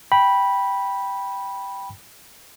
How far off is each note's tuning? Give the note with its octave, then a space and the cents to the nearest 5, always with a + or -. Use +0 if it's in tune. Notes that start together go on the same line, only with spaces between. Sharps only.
G5 +0 B5 -10